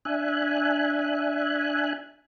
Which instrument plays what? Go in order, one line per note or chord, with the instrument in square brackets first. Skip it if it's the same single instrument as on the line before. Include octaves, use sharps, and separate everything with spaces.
[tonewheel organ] D4 E5 G#5 F#6